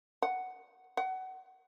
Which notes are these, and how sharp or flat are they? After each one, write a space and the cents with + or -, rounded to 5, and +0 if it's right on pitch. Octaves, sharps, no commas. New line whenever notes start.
F#5 +5
F#5 +25